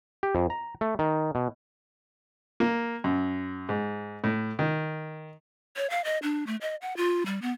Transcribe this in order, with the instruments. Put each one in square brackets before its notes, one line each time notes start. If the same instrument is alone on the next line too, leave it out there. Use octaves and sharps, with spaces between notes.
[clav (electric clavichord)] G4
F2
A#5
A3
D#3
B2
[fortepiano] A#3
F#2
G#2
A2
D#3
[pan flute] C#5
F5
D#5
D4
A3
D#5
F#5
F4
G3
B3